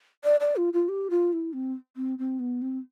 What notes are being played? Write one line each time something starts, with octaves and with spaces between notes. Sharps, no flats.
D5
D5
F4
F4
G4
F4
E4
C4
C4
C4
B3
C4